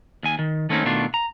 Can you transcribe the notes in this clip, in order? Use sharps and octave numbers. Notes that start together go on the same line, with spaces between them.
D#2 G#5
D#3
D#3 A3 A#3 C4 C#4 D#4
B2 D#3 A3 D4 F4
A#5